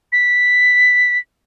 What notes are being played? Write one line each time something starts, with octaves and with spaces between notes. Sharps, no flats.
B6